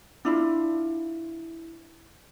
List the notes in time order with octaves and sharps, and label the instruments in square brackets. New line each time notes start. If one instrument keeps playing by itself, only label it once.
[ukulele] D4 E4 F4